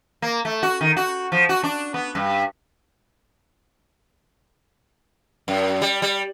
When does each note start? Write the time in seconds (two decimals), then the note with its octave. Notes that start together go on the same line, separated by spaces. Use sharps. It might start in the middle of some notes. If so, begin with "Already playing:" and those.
0.22 A#3
0.45 A3
0.63 F#4
0.81 D#3
0.97 F#4
1.32 F3
1.49 F#4
1.63 D4
1.94 B3
2.15 G2
5.48 F#2
5.82 G3
6.02 G3